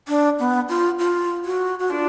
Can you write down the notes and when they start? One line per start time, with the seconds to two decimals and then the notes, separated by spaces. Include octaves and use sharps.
0.08 D4
0.39 B3
0.69 F4
0.99 F4
1.44 F#4
1.79 F#4
1.90 D4 F4